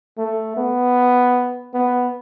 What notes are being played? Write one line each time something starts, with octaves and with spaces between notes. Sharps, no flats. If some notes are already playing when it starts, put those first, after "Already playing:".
A3
B3
B3